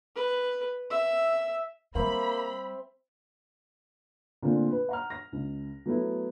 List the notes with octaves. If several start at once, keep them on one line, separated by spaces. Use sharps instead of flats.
B4
E5
G3 A#3 C4 E5 B5
A#2 D3 A3 C4 D4 F4
B4
F#5 A#5 F6
A#6
C#2
F#3 A3 B3 E4